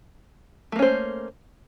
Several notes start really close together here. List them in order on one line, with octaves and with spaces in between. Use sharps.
A3 A#3 C#4 C5